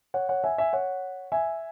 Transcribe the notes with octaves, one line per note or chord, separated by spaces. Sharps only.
C#5 F#5
C#5 F#5
E5 G#5
E5 G#5
C#5 F#5
E5 G#5